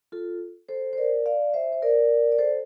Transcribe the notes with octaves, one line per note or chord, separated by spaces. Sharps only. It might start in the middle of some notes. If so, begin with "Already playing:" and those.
F4 A4
A4 C5
C5
A#4 D5
D5 F5
C5 E5
C5
A#4 D5
D5
A4 C5